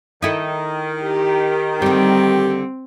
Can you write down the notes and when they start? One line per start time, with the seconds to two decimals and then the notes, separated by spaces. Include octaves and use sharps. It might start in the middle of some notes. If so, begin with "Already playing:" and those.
0.22 D#3 D#4 E4 A4
1.03 G4
1.82 D3 G3 C4 G4